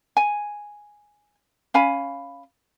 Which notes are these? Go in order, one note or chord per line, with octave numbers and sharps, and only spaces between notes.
G#5
C#4 F5 G#5 B5